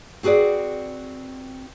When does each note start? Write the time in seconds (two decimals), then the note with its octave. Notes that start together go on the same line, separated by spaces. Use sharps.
0.23 C4 F#4 G#4 B4 D5